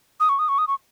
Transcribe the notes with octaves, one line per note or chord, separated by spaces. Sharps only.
D#6
C#6
D#6
C#6
D#6
C#6